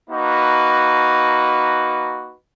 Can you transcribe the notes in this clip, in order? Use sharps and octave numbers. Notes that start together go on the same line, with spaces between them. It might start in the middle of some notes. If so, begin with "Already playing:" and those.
A#3 D#4 F#4 B4